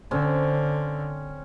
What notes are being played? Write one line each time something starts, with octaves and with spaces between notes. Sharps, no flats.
D3 C4 C#4